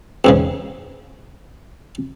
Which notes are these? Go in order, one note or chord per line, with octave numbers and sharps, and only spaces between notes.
E2 G#2 C#3